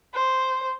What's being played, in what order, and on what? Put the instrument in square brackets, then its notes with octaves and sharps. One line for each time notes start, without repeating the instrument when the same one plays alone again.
[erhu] C5